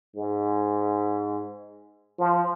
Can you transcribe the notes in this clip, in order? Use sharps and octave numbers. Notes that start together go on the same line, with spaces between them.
G#2
F3